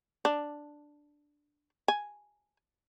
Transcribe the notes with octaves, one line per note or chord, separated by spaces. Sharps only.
D4
G#5